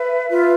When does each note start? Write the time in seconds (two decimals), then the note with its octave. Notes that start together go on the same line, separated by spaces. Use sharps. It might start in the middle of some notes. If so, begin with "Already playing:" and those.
Already playing: B4 E5
0.29 F4 B4 E5